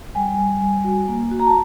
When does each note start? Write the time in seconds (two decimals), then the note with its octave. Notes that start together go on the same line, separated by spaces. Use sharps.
0.15 G3 G#5
0.38 G3
0.62 G3
0.84 F#4
1.08 A#3
1.31 F#4
1.40 A#5
1.47 A5